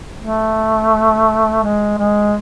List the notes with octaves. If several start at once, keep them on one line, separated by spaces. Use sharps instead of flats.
A3
G#3
G#3